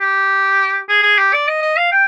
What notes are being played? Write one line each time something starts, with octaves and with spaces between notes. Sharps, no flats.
G4
G#4
G#4
G4
D5
D#5
D#5
F5
G5